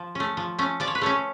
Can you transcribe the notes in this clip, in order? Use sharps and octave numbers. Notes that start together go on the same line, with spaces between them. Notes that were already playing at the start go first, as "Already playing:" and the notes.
Already playing: F3
A3 C#4
F3
A3 C#4
F3 D5
C#5
B4
A3 C#4 C#5